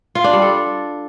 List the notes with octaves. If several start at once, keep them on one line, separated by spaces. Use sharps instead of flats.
F4
D4
G3
A4